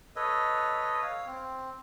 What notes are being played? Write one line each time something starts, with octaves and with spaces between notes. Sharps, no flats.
A4 B4 C#5 D#5
C#5 F5
C4